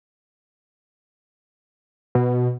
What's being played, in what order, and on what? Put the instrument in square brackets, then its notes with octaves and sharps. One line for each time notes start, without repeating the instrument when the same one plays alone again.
[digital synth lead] B2